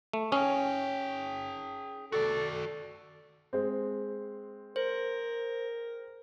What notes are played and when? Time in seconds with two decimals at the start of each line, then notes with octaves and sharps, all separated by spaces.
0.13 A3
0.32 C#4 G#4 G5
2.12 F#4 A4 D5
3.53 G#3 C4
4.76 A#4 C5